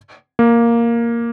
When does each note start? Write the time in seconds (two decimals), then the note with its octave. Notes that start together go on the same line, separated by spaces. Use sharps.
0.39 A#3